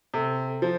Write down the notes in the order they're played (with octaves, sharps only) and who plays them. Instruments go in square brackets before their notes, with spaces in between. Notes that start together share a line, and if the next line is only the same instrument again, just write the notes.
[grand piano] C3 [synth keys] A4
[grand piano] F3 [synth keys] C5